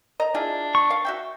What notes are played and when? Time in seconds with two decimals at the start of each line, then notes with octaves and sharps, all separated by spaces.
0.20 D#5 A#5
0.35 D4 E4 F4 G#4
0.75 C#6
0.90 F5
1.05 F#4 E5 G5